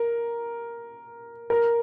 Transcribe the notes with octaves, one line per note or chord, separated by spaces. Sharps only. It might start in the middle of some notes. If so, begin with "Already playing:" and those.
Already playing: A#4
A#4